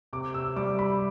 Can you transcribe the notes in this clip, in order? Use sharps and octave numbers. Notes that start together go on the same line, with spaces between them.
C3 D6
E6
G3 D6
B5